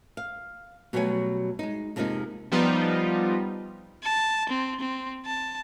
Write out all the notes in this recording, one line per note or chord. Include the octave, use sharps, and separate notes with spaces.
F5
B2 F#3 G3 A3 C#5 G#5
G#3 D#4
F2 C3 F3 G#3 A#3 D#4
F3 G3 B3 D#4 F4
A5
C4
C4
A5